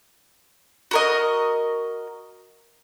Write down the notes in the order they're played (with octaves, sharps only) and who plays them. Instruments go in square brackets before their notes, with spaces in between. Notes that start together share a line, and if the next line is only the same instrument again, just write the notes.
[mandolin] F#4 A#4 D#5